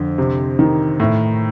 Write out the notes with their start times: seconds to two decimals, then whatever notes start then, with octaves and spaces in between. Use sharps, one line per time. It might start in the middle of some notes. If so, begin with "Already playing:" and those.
Already playing: F2 D3
0.18 C3
0.59 D#3
1.00 A2